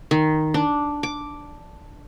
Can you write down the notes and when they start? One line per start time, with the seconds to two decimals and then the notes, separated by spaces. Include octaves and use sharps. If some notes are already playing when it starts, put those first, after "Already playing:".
0.11 D#3
0.54 D4
1.03 D6